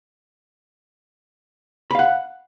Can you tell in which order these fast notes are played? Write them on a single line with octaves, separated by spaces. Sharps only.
B5 F5 F#5